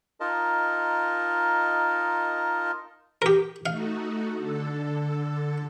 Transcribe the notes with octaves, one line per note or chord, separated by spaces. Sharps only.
D#4 F4 A#4 D#5 A5
G4 A#4
A3 D#4 F#4 F5
D3 A4